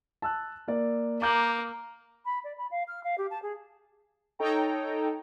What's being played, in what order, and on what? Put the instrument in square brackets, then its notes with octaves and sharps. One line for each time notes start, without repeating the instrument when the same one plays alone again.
[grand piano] A5 E6 F#6
A#3 D5
[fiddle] A#3 [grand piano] D6 G6 F#7
[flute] B5
D5
B5
F5
F6
F5
G4
A5
G#4
[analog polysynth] D#4 A4 C#5 G5 A#5